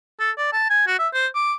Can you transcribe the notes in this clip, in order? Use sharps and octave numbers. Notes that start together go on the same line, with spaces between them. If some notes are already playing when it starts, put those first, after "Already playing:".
A4
D5
A5
G#5
F#4
E5
C5
D6